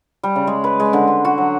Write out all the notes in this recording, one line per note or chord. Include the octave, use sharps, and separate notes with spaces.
G3
C#3
G#3
B4
G#3
D3
C6
F#4
F#3